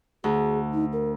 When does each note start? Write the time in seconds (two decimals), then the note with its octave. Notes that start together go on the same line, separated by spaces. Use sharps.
0.24 D2 G#4
0.73 D#4
0.93 A#4